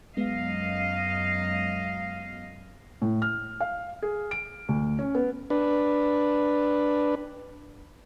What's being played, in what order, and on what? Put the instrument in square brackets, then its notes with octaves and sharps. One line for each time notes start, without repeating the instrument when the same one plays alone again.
[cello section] F#2 D#5 F5 [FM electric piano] G#3 B3
[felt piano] A2
F6
F5
G#4
D7
D2
C#4
B3
[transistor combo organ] D4 B4